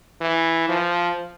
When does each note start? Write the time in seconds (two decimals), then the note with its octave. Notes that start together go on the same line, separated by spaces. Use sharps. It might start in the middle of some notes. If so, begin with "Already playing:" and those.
0.21 E3
0.69 F3